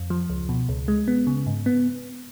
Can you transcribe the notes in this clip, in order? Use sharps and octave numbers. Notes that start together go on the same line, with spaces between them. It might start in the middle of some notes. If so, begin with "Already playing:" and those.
Already playing: F2
F3
C#2
B2
C#2
G#3
B3
C#3
G#2
B3